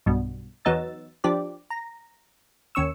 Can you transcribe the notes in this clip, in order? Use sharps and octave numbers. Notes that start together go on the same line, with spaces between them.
B1 G2 B2
E2 F#3 B3 D#4 E6 A6
F3 D4 G4 D5
A#5
D#2 C#4 C#6 E6